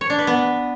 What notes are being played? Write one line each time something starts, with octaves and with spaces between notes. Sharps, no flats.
C#5
D4
B4
B3